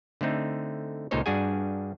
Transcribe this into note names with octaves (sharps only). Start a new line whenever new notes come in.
D3 A3 C4 D#4
C#2 A#2 D#4 A4 C5 C#5
G2 G3 D4 F#4 G#4 G#5